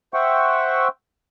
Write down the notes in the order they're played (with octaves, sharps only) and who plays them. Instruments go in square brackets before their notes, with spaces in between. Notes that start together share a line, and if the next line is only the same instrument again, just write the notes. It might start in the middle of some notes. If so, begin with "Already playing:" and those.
[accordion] C5 E5 F#5 G5 C#6